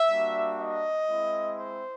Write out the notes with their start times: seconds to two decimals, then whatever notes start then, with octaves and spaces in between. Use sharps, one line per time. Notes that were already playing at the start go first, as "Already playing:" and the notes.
Already playing: E5
0.09 G3 A#3 D4 F#4
0.58 D#5
1.07 G#3 C4 E4
1.57 C5